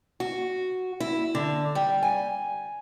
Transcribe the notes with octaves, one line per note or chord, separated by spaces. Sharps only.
F#4
E4
D3
G3
G#5